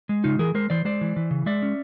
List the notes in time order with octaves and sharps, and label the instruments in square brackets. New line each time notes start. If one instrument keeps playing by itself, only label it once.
[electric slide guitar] G#3
C#3 D#4 F4
E3 G#4 A#4
G#3 A#4 C5
E3 C5 D5
G#3 C5 D5
E3
E3
C#3
G#3 D5 E5
C#4